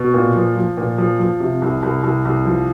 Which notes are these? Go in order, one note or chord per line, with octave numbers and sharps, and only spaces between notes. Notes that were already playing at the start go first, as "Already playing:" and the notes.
Already playing: B2
A#2
F3
F3
A#2
F3
F3
C3
C2
C2
C2
C2
F3